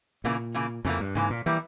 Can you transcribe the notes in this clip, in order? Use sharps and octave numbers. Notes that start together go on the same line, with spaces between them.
A#2 C#3 E3 A#3
C#3 E3 A#3
F2 C#3 E3 A#3
G2
G#2 C#3 E3 A#3
A#2
E3 G3 A#3 E4